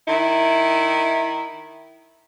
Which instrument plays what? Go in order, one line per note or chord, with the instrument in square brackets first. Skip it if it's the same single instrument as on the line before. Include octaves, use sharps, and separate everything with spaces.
[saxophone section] D#3 E4